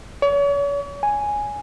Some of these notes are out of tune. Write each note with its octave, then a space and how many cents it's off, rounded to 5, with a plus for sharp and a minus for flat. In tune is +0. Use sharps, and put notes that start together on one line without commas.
C#5 +40
G#5 +0